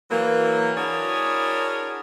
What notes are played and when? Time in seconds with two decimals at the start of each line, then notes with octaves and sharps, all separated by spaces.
0.11 E3 F#3 A#3
0.77 D4 E4 F#4 G#4 A#4 C#5